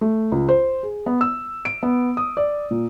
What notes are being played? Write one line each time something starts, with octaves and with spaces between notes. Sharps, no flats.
A3
C#2
C5
G#4
B3
E6
D7
B3
D#6
D5
A#2